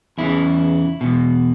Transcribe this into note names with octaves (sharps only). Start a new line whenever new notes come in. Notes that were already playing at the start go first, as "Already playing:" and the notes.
E2 C#3 E3 E4
E2 B2